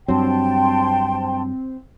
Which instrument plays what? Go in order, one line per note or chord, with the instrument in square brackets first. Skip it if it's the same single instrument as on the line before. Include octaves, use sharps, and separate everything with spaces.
[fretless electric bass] G2 F#3 [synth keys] C4 [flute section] G5 A5 C6